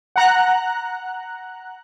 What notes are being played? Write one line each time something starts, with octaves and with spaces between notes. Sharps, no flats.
F#5 A#5 F#6